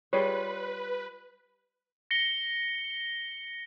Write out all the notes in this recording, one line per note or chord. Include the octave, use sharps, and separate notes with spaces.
G3 F4 G#4 B4 C#5
A#6 C#7 G7